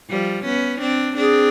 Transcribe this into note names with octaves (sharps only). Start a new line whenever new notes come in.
F3 G3
B3 C#4
C4 D4
C4 D4 G#4